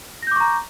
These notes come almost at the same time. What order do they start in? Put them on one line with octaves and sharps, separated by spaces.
A#6 G6 D6 C#6 A#5